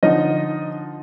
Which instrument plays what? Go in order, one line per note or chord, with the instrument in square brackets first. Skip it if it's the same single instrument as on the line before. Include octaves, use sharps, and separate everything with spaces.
[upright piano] D3 F3 D#4 D#5